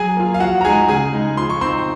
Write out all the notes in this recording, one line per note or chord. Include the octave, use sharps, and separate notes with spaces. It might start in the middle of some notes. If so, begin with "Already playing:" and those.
Already playing: F#3 G#4 G#5
A#3 F4
F5
F3 F#4 F#5
A#5
G#3 D#4 G#4 G#5
C#3 G#4 G#5
G#3 D#4
F3 C6
C#6
C4 D#4 C5 C6